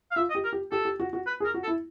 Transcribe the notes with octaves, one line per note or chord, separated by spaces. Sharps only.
F5
F4 E5
D#5
G4
A#4
G4
G4 A4
G4
F#4
F#4
B4
G#4
A#4
F#4
A4
E4